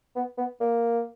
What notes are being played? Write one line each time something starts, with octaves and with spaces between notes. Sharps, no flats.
B3
B3
A#3